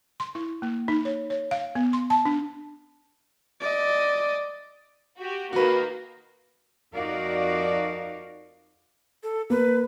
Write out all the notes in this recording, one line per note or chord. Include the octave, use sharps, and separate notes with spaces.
C6
E4
A#3
D#4
C#5
C#5
F5
B3
C6
A5
D4
D5 D#5
F#4 G4
D#3 A#3 F#4 B4
F2 D#4 F#4 A#4 D5 F5
A4
A#3 B4